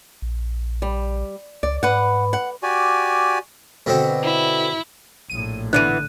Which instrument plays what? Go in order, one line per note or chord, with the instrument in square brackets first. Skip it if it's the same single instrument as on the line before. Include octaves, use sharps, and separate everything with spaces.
[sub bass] A#1
[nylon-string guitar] G3
[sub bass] C#2 [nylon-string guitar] D5
[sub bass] G#2 [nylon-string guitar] B4 F#5
[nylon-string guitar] F#5
[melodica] F#4 G4 D5 G#5
[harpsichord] B2 D3 C4
[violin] E4
[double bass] A#1 A2 [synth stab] D#7
[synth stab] D3 [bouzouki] E3 F3 B3 [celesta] F#6 D#7